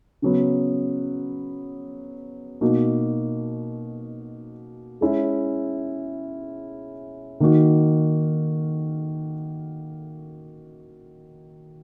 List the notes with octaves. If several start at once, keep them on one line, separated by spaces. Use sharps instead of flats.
C#3 F#3 B3
B2 A#3 D#4 F#4
G#3 C#4 E4
D#3 A#3 D#4 F#4